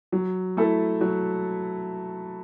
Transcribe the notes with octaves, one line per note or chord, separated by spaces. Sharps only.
F#3
A3 E4 A4
F#3